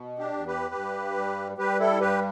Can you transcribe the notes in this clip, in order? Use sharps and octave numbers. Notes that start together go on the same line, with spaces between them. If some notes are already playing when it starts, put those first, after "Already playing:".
Already playing: B2
D4 G4
E2
G4 B4
G2
G3
G3 G4 B4
E4 A4
G2 G4 B4